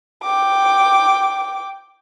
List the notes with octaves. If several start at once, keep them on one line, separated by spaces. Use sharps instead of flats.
G5 D6